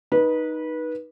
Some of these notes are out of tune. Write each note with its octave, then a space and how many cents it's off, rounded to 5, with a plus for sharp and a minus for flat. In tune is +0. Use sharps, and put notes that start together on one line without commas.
D#4 +0 B4 -25